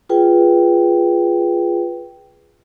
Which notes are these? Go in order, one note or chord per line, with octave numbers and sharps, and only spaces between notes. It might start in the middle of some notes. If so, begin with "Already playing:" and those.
F4 G#4 B4 G5